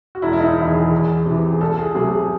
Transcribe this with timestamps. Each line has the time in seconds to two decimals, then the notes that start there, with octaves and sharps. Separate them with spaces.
0.15 F#4
0.22 E1 E4
0.33 E4
0.40 D#4
0.57 E2 D#3 E4
0.74 G#4
0.91 E2
1.26 C3 E3
1.52 G#4
1.61 C2 A4
1.78 G#4
1.95 C3 F#3 A3 G#4
2.13 G#4